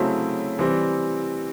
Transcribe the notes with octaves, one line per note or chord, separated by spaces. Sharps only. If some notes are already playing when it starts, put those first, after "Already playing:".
Already playing: C#3 F#3 A3 C4 E4
E3 G3 C4